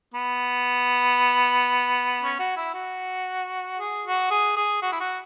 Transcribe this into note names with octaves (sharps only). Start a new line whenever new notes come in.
B3
C#4
F#4
E4
F#4
G#4
F#4
G#4
G#4
F#4
E4
F#4